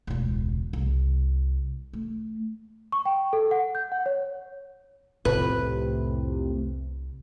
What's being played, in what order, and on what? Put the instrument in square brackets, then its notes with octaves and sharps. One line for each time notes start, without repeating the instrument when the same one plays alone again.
[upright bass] E1 C#2
C2
A3
[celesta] C#6
G5
A4
F#5
G6
F#5
C#5
[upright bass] C2 [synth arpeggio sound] F2 A2 C3 [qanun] B4